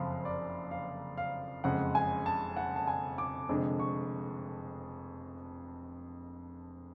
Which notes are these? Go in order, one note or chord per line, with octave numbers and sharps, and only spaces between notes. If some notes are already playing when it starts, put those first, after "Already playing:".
Already playing: F#1 F2 F3 F5
D5
F5
F5
F#1 F2 C#3 G#3 F#5
G#5
A5
F#5
A5
G#5
D6
F1 F2 D3 G#3 D4
C#6